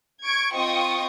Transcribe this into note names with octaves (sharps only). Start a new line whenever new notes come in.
C#6 G#6 D7
C4 F4 D#5 G5 C#6 D#6